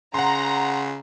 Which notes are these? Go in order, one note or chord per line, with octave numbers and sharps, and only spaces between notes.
C#3 F#5 A#5 C6